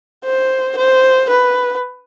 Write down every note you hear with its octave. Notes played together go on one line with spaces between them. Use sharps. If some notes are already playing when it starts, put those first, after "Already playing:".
C5
C5
B4